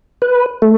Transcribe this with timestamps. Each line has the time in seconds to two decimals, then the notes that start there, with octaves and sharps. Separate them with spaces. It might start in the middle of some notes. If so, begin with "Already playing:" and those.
0.22 B4
0.62 A3